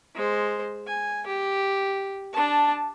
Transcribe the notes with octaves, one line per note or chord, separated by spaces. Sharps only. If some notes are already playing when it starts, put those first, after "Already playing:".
G#3 C5
G#5
G4
D4 A5